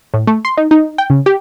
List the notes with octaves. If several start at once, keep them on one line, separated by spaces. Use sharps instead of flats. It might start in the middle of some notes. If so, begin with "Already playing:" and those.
A2
A3
C6
D#4
D#4
G5
C#3
G4